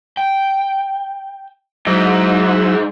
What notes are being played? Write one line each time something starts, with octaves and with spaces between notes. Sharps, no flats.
G5
G#2 F#3 E4 D#5